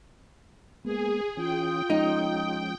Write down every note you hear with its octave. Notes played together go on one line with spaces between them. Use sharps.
G#3 A#3 B3 G#4
E3 C#4 F4 G5 D#6
F3 G#3 C#4 D#4